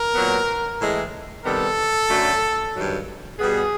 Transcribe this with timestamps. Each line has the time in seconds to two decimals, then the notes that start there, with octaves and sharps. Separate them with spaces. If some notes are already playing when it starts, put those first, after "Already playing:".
Already playing: A#4
0.14 A#2 F#3 B3
0.80 A2 E3 G#3
1.45 C3 D#3 G3 B3 A4
2.09 F#2 D3 F#3 A3
2.74 G2 D#3 F#3
3.39 B2 G3 B3 G#4